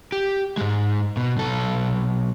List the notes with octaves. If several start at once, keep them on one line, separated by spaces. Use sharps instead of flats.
G4
G#2 G#3
B2
B1 A4